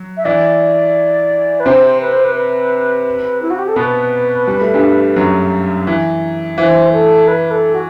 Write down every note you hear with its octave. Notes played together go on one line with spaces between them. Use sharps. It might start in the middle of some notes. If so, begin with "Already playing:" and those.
Already playing: F#3
E5
E3 E4 D5
B4
C3 C4 C5
B4
C5
B4
B4
E4
F#4
G4
A4
B2 B3 B4
G3
A3
G2 G3
F#2 F#3
E3
E3 C5
A4
B4
A4
F#4